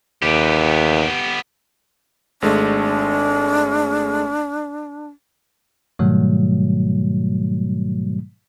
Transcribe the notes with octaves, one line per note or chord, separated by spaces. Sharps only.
D#2 B3 G4
G#1 G#3 A3 D4
G#2 B2 D#3 F#3 G3 A3